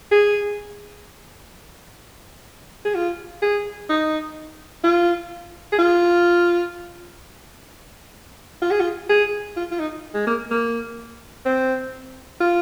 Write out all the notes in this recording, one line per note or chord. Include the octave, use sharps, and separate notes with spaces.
G#4
G#4
F4
G#4
D#4
F4
G#4
F4
F4
G#4
F4
G#4
F4
F4
D#4
G#3
A#3
A#3
C4
F4